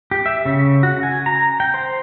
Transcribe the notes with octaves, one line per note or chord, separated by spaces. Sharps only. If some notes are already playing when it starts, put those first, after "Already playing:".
G4
E5
C#3
F#4
G#5
A#5
G5
C5